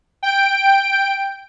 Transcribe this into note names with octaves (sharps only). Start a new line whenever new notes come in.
G5 D7